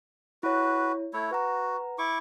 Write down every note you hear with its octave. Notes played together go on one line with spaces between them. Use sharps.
E4 F#4 B4 C#5
A3 E4 C#5
F#4 B4 F#5 A#5
E4 C#6 D6